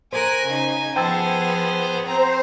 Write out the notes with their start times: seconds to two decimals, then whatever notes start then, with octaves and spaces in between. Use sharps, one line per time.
0.13 A#4 C5 G#5 F#6
0.46 C#3 D#4
0.96 F3 B3 G#4 C5 G5 A5 E6
2.06 C4 C5 A#5